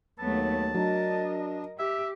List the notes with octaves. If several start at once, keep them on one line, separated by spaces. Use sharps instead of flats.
D#2 F#3 A3 B3 A5
F#3 D4 A#4 D#5
G4 E5